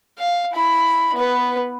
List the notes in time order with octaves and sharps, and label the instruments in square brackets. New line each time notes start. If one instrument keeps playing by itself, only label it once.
[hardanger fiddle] F5
E4 B5
B3 B4